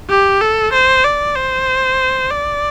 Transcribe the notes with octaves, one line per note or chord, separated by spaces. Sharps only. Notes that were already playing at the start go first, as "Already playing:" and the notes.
G4
A4
C5
D5
C5
D5